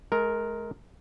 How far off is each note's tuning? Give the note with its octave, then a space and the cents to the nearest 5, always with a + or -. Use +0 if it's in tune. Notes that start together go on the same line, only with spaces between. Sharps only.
G#3 +35 A#4 +0